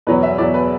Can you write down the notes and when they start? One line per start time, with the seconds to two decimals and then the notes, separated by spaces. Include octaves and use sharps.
0.07 E2 B2 F#3 B4
0.23 E5
0.38 E2 B2 F#3 D5
0.54 B4